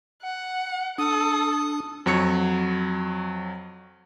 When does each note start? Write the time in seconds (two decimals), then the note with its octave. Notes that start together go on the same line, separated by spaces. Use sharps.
0.22 F#5
0.98 D4 A4 D#6
2.06 F2 F#3 C#5 C#7